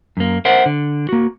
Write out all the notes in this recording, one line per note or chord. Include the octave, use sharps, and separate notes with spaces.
F#2 A#3
A#4 C5 E5 F#5
D3
A#3 F#4